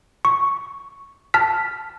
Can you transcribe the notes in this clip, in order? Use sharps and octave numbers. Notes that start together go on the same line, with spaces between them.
C#6
A5 F6 B6